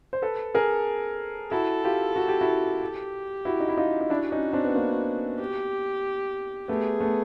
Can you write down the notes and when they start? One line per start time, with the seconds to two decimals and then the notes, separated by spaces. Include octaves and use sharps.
0.13 C5
0.22 A4 B4
0.55 G#4 A#4
1.52 E4 F#4 A4
1.84 F4 G4
2.16 F#4
2.28 G4
2.41 E4 F#4
2.81 G4
3.45 E4 F#4
3.60 D#4
3.69 E4
3.77 D#4 F4
4.01 D#4
4.10 D4 E4 F#4
4.31 C#4 D#4
4.53 C4 D4
4.65 B3
4.75 A#3 C4
5.39 G4
6.68 A3 B3 G#4
7.00 A3 B3